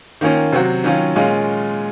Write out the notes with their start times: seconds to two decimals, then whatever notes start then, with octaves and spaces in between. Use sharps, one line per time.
0.21 D#3 A#3 C#4 F4
0.52 C3 F#3 C4 F#4
0.84 D#3 F#3 C#4 F4
1.16 A#2 G#3 C#4 F4